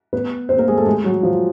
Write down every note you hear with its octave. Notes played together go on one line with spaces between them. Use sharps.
B3 B4
C4 C5
A#3 A#4
G#3 G#4
A3 A4
G#3 G#4
F#3 F#4
F3 F4